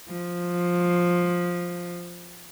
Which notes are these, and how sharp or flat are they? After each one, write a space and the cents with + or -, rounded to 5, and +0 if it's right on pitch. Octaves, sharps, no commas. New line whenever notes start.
F3 +10